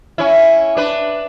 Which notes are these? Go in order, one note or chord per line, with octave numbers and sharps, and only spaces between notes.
C#4 E4
D4 B4